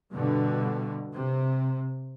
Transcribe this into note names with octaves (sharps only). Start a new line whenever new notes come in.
G2 B2 D3
C3